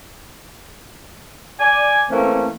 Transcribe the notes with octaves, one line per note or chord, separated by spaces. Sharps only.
D5 G#5
E3 A3 A#3 C4 C#4